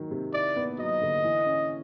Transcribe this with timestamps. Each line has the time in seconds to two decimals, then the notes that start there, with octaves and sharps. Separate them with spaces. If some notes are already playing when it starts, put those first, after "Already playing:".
Already playing: D#3 F#3
0.11 C3
0.33 E4 D5
0.56 B3
0.78 F#3 D#5
1.01 D3
1.24 E3
1.46 C#4